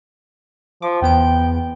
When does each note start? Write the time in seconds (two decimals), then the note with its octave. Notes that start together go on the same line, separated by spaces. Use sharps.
0.82 F3 D6
1.02 E2 B3 G5 D7